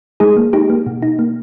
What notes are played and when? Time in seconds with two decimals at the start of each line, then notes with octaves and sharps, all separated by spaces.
0.20 G#3 D#4 G#4
0.37 A#3
0.53 D#4 G4
0.70 A#3
0.86 B2
1.02 D#4
1.19 A#3